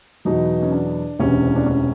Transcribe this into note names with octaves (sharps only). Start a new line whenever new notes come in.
E2 B2 F#3 D#4
C#4
D4
E1 D2 C3 E3 C#4
D4
C#4